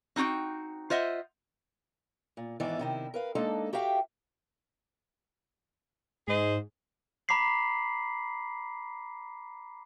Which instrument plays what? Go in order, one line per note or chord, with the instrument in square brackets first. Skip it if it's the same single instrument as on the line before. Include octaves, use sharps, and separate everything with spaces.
[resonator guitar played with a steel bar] C4 D#4 E4 F#4 G5
F4 C5 D#5 E5 F#5
[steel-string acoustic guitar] A#2
G#2 D#3 E3 B3 E4 D5
C3 D#3 E4
A#4 B4 F5
G#3 A#3 D4 D#4 A4
F#4 G4 E5 F5 G5
[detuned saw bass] G#2 [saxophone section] G#4 C5 D#5
[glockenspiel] A#5 B5 D6 B6 C7 F#7